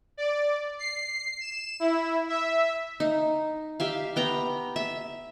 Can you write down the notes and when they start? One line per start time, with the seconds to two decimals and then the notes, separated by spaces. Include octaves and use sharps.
0.17 D5
0.79 C7
1.41 E7
1.80 E4
2.29 E5
3.00 D#4
3.80 G4 E5 F5
4.16 B3 G5 A#5
4.76 E5